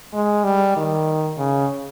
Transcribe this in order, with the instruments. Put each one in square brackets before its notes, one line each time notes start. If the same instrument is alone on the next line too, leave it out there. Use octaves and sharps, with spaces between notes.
[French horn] G#3
G3
D#3
C#3